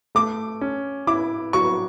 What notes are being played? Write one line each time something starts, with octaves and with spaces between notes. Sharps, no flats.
A3 D6
C#4
E4 D6
F#3 C#6